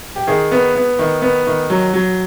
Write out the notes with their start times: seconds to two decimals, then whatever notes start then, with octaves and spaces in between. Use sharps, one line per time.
0.16 G4
0.27 D#3 G#4
0.52 B3
0.76 B3
0.99 D#3
1.22 B3
1.47 D#3
1.70 F#3
1.94 F#3